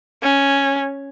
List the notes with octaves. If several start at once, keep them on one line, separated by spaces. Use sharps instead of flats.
C#4